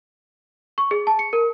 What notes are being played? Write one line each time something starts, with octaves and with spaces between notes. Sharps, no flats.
C#6
G#4
A5
C#7
A#4